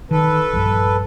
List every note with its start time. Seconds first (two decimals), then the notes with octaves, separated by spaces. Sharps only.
0.11 D#3 A4 B4
0.53 A#1 G2